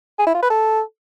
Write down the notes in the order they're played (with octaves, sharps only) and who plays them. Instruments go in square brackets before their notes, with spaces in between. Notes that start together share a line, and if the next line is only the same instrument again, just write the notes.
[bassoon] G#4
E4
F4
B4
A4